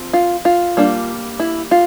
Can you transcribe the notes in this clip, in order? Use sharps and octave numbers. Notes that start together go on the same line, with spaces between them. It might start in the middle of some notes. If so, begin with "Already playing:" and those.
Already playing: F3 C4
F4
F4
G3 A#3 D4
E4
F4